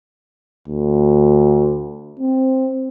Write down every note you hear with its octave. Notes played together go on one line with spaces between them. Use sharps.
D2
C4